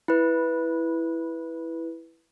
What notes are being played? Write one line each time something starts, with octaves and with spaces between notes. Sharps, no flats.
E4 B4